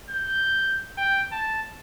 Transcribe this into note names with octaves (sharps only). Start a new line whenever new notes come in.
G6
G5
A5